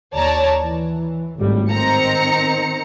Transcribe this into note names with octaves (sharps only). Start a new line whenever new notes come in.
D#2 C#5 D5 A5 A#5
E3
G#1 A2 G3
D#3 C4 A#5 C#7